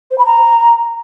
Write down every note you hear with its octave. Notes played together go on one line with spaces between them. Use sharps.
C5
B5
A#5